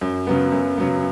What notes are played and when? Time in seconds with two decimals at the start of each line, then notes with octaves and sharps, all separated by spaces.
0.01 F#2
0.27 C#3 F#3 B3
0.52 F#2
0.78 C#3 F#3 B3